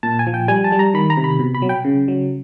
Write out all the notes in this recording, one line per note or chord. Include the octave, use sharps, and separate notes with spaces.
A#2 A5
G#5
F3
G5
G3 G#5
A5
G3
A#5
D#3 B5
A#5
C3
B5
B2
B5
F#3
G5
C#3
F#3